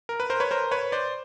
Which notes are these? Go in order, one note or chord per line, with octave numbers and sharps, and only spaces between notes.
A#4
B4
A#4 C5
B4 C#5
A#4 C5
B4 C#5
C5 D5